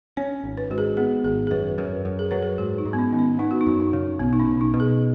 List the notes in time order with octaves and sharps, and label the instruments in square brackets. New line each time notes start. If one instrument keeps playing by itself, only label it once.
[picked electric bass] C#4 [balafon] C#5
[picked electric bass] G#1
[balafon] B4
[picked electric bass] G#2 [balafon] F#4
[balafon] G#4
[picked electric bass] B3 [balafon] G#4
[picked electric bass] G#1 [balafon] G#4
[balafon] G#4
[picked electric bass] F#2 [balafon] B4
[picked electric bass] F#2 [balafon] B4
[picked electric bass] F#2
[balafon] G#4
[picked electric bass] F#3 [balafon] B4
[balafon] G#4
[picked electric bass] G#2 [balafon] F#4
[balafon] D#4
[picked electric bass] G#2
[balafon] B3
C#4
[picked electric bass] D#3 [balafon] B3
[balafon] C#4
[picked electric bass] B3 [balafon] D#4
[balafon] F#4
D#4
[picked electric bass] F#2
[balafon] D#4
[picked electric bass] C#3
[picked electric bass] B1 [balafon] B3
[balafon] D#4
C#4
[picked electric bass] B1
[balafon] D#4
[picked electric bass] B2
[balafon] G#4